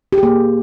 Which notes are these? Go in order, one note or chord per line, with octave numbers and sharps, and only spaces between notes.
G4
G#4
A#3